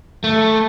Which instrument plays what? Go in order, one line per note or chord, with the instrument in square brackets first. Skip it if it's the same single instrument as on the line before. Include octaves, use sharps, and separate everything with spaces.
[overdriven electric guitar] A3